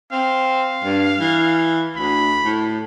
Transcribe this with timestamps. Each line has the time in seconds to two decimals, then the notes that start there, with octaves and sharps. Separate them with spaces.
0.12 C4 F5
0.84 G2
1.20 E3
1.97 D2 B5
2.45 A2